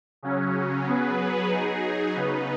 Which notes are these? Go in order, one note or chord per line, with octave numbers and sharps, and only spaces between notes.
C#3 F#3 C#4
F#3 B3 G#4 B4
F#3 D#4 G#4
C#3 B3 D#4 B4